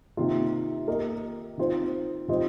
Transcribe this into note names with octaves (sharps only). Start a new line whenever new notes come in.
C3 D#3 A#3 F4
A#3 G4 A#4 D#5
D#3 C4 F4 C5
D#3 G3 C4 F4 D#5